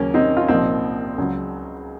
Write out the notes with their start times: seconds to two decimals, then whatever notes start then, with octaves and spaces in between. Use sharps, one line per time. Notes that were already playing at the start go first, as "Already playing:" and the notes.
Already playing: D#2 C#3 F#3 A#3 C#4
0.14 C4 D#4
0.37 F4
0.48 C2 A#2 F3 C4 D#4
1.18 C#2 C#3 F#3